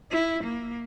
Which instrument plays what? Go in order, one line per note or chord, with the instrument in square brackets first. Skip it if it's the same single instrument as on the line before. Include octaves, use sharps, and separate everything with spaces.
[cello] E4
A#3